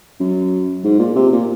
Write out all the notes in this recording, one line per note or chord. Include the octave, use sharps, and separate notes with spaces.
F#2
G#2
A#2
C3
A#2